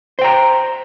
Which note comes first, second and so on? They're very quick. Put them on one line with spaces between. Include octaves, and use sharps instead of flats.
C5 G5 A#5